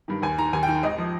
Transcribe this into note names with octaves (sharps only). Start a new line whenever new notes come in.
G2 D#3
D#2 G#5
D#3 A#5
D#2 G#5
G5
D#3
G#1 D#5
F3